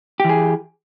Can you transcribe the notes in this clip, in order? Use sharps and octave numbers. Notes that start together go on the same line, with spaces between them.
E3 G4 G#4